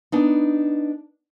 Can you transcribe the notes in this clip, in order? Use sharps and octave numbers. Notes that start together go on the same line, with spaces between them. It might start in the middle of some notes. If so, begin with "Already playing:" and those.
B3 D4 D#4